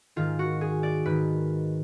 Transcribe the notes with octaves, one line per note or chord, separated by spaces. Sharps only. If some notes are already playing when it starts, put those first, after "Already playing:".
G#2 D#3 F4
F#4
G#4
D5
G#2 D#3 B4